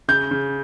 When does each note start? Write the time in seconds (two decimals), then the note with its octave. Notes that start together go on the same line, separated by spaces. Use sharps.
0.08 C#3 G6
0.31 C#3